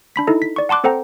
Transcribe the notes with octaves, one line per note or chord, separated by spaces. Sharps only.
D4 B5 B6
D#4 E4 A4 D#5
B6
D5 C#6
F#5 A5 C6 D6 F#6
C4 A4 C5 F#5 G5 A#5